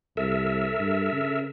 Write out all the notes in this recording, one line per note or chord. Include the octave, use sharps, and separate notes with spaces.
C2 A4 A#4 E5
G2
C#3